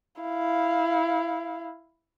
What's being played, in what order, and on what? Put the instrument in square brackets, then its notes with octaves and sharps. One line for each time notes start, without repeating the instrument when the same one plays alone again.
[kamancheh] E4 F5